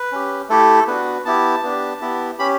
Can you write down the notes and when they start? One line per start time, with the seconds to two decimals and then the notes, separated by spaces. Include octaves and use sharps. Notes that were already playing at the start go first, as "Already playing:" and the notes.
Already playing: B4
0.12 C#4 G4
0.50 A3 E4 G4 A4
0.87 B3 D4 F#4 B4
1.25 B3 E4 G4 A5
1.63 B3 D4 G4
2.01 B3 E4 G4
2.39 C#4 G4 B5